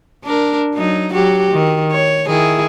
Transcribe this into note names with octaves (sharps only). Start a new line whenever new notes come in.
D4 A#4
F#3 D#4
F#3 F#4 G4
D#3
C#5
D#3 E4 G#4